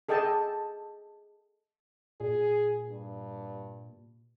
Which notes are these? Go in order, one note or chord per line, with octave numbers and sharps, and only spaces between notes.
G#4 A4 D#5 G5 A5
A#2 G#4
G2